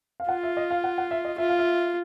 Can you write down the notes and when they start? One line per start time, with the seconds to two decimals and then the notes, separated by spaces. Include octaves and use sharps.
0.20 F5
0.29 F4 F#5
0.43 E5
0.57 D#5
0.71 F5
0.84 F#5
0.98 F#5
1.11 E5
1.25 D#5
1.38 F4 E5
1.49 F5
1.59 E5